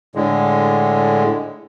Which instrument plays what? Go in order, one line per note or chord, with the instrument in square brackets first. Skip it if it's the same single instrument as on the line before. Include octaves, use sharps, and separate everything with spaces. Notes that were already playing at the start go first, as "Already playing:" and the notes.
[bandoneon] A2 D3 G#3